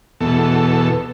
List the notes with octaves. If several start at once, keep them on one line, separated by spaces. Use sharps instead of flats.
E2 B2 A4